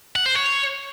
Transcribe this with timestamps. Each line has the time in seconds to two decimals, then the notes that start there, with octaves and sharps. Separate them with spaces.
0.16 F#5
0.26 C5
0.36 C#5